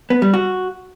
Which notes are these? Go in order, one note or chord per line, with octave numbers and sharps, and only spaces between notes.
B3
G3
F#4